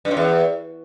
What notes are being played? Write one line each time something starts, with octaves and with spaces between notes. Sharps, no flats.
G2
F#2
E2